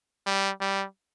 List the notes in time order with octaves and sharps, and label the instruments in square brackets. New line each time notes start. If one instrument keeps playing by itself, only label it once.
[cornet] G3
G3